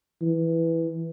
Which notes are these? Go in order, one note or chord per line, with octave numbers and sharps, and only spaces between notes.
E3